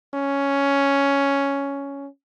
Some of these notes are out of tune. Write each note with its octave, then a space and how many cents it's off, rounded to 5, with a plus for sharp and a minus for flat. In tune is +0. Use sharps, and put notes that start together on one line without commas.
C#4 +5